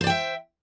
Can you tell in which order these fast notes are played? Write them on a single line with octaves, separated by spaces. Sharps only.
C5 D5 G5 E5